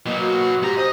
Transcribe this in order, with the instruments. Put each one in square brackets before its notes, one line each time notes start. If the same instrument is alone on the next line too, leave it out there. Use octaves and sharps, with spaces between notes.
[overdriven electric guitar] B2 F#3 [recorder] A#3 [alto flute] D#5
[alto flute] F#4
[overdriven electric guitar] G#2 A#5 [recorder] G4
[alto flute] C5 [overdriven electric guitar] D#5